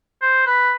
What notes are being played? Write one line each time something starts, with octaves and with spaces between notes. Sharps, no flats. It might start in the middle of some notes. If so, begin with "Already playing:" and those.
C5
B4